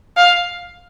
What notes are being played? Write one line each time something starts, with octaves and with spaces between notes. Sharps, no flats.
F5